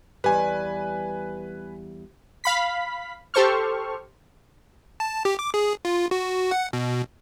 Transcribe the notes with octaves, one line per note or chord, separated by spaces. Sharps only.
E2 G3 B4 G#5
F5 B5 B6
G4 A4 C5 C#6 F6
A5
G4
D6
G#4
F4
F#4
F#5
B2